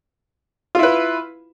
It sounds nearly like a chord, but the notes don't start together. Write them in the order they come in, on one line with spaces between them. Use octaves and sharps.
F4 E4 B4